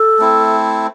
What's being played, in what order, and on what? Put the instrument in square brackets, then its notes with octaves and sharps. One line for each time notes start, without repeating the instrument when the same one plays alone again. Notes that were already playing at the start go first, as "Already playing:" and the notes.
Already playing: [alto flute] A4
[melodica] A3 C4 E4